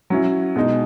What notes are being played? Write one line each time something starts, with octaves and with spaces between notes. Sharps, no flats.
F#3 C#4 E4
B2 G#3 D#4